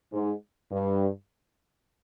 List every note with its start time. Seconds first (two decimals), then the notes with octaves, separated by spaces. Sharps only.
0.13 G#2
0.72 G2